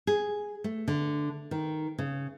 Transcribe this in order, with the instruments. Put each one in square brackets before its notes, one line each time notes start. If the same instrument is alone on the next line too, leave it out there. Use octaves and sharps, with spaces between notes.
[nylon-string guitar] G#4
A3
D3
D#3
C#3